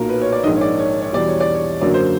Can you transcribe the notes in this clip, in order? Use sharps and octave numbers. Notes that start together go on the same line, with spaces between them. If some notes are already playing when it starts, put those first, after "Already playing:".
Already playing: B1 A#2 F#3 A#4
B4
C#5
D5
A#1 G#2 D#3 D#5
C#5
D5
C#5
C#5
E2 B2 G3 D5
C#5
D5
C#5
F#2 D3 F#3 A#3 D5
C5